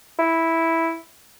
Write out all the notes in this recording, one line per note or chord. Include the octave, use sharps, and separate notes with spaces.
E4